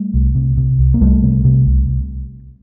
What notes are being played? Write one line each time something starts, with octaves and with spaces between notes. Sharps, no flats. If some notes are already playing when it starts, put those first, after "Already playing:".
Already playing: G3 A3
C2
C3
C3
C2
A#3
C2 G3 A3
C3
C3
C2